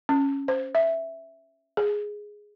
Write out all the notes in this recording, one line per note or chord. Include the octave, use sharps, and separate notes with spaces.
C#4
C5
E5
G#4